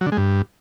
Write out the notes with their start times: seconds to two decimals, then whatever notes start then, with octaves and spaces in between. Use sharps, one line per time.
0.01 F#3
0.06 D3
0.12 G#3
0.17 G2